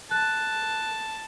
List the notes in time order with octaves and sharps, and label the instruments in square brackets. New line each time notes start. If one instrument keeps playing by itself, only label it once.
[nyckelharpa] A5 [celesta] F#6 A6